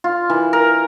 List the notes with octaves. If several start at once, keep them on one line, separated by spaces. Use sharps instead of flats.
F4
E3
A#4